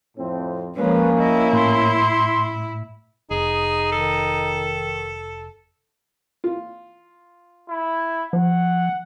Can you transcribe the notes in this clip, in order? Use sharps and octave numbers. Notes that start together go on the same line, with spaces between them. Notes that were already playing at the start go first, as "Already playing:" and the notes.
F2 A2 C4
F3 G#3 A#3 C#4 B4
E4 D#5
A2 C6
F1 D#4 G#4
D#3 A4
F4
E4
F3 F#5